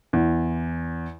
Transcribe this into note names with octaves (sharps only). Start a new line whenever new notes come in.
E2